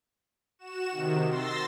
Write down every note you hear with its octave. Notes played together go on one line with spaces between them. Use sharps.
F#4 E7
C3 D#3
C6 E6 A6 A#6